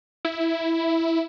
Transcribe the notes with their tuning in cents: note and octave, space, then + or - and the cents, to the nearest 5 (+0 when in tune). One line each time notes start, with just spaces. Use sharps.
E4 +0